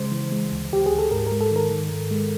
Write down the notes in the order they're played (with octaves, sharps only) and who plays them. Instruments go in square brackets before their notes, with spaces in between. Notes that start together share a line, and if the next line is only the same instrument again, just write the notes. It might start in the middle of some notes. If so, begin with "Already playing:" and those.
Already playing: [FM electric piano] C#3 G#3 C5
E3
G#3
D2
D2 G4
G#4
D2
A4
G#2 A#4
G#3 A#4
A4
D#3 A#4
D#3
G#2
G#3